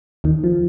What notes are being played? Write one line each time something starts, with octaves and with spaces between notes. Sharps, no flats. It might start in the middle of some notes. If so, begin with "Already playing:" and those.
D#2 D#3
F3